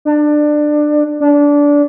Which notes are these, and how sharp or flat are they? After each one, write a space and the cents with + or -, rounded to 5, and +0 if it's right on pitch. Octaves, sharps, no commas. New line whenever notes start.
D4 +20
D4 -20